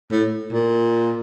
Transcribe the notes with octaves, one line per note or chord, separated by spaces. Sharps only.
A2
A#2